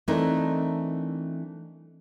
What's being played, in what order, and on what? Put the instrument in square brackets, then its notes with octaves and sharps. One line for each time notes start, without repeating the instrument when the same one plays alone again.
[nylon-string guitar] E3 A3 C4 D4 D#4 A#4